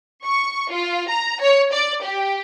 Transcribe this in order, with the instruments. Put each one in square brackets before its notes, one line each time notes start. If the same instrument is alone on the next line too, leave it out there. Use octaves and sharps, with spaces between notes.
[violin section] C#6
F4
A#5
C#5
D5
G4